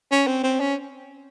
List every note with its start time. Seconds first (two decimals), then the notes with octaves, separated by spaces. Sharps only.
0.11 C#4
0.27 C4
0.43 C4
0.60 C#4